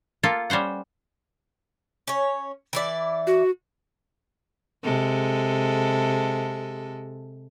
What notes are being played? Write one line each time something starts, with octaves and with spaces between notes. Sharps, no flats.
A#3 F4 A4
G3 C#4 C5 F#5
C#4 C#5
E3 E4 D5
F#4
C3 G#3 A4